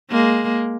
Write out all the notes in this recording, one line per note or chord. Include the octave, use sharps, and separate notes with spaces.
G#3 A#3